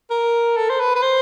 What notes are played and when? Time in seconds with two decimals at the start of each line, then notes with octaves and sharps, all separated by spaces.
0.10 A#4
0.56 A4
0.70 C5
0.80 B4
0.96 B4
1.02 C5